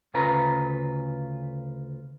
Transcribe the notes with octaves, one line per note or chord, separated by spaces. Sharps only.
D2 C#3 F4 B4 A#5